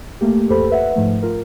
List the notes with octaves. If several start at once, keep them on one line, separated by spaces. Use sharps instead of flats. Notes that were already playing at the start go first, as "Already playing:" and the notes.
A3 A#3 G4
A1 F2 G4 A4 C5 B5
B4 E5 F#5
G#2 F3 A3
F4 A#4